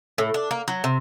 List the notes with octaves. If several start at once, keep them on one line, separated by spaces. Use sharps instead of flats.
A2
D4
A#3
F#3
C3